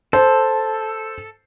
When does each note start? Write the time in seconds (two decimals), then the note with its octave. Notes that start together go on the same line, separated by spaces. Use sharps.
0.13 A4 C5